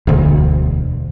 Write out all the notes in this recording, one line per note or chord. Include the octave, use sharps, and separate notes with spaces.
E1 D2